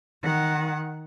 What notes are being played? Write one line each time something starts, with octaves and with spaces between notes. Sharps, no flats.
D#3 F#5